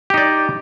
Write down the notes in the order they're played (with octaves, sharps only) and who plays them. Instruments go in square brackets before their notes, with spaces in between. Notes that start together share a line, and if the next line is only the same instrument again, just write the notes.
[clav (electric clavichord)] G4
D#4
D5